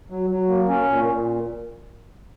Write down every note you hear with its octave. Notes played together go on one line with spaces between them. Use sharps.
F#3
F#3
A#3
C#4
A#2
A#2